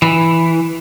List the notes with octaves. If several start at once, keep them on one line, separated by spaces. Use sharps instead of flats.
E3